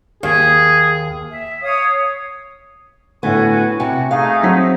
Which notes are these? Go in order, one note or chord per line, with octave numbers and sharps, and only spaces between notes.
D#2 G#4
E5
C#5 F5 D#6
A2 D3 B3 F#4 G#5
C3 F#4 G#5
A3 D#4 G#4 F5
F#3 C4 B6